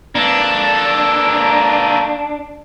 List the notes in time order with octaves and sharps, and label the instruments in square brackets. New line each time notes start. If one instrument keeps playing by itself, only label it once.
[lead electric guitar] A#3 A4 [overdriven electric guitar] D4